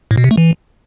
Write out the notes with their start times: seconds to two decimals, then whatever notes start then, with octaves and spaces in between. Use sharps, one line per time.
0.11 A2
0.18 B2
0.24 C3
0.31 A3
0.38 E3